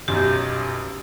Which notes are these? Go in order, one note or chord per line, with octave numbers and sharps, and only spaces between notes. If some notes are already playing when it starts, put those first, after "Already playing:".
B1 F#2 G4